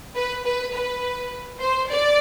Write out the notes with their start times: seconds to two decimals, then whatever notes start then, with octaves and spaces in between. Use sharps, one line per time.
0.15 B4
0.44 B4
0.73 B4
1.60 C5
1.89 D5